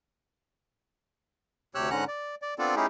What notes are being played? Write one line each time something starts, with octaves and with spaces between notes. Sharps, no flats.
D2 C3 G4 C#5 E6 F#6
G#2 D3 C#4 F#5 A#5 F#6
D5
D5
B3 C4 D4 F4 A4 D5
A3 C#4 D#4 E4 G4 G#4